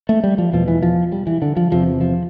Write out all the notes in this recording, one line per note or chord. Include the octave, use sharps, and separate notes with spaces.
A3
G3
F3
E2 B2 F3
E3
F3
G3
E3
D3
F3
E2 C3 F3
F3